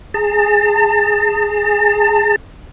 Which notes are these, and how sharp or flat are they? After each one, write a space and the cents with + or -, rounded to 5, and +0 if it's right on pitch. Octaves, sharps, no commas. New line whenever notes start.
G#4 +0 A5 +35